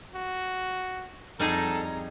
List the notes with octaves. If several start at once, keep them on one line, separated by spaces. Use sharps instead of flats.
F#4
F2 G3 D#4 G#4 A4 A#5